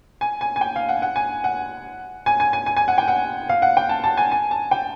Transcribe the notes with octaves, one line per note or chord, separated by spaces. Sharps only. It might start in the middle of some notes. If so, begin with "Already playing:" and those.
G#5
G#5
G#5
G5
F5
F#5
F#5
G#5
F#5
G#5
G#5
G#5
G#5
G#5
F#5
G5
F#5
F5
F#5
G5
A5
A5
G#5
G#5
A5
G5